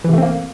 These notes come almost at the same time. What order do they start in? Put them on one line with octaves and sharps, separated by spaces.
E3 C3 A3 C4 A#3